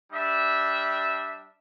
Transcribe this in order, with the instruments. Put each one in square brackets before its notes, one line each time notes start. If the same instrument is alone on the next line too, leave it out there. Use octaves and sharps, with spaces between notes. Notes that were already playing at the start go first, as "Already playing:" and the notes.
[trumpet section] G3 D4 E5